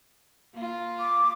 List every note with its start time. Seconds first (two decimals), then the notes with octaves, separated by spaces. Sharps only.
0.54 A#3 F4
0.99 D6